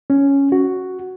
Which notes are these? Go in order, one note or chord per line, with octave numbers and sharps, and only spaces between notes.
C#4
F#4